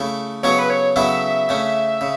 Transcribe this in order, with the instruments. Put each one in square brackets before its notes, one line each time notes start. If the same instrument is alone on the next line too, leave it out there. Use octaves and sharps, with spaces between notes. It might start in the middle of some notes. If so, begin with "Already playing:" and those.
Already playing: [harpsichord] C#3 A3 E4 A4
[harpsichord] C#3 F#3 B3 E4 A4 [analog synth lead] C#5
[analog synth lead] B4
C#5
[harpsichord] C#3 F#3 B3 E4 A4 [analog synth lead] E5
[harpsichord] C#3 A3 C#4
C#3